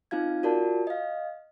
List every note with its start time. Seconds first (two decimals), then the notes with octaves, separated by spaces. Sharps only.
0.11 C4 D#4 F4 F5 G#6
0.43 F4 F#4 A#4 D5 A5
0.87 D#5 F5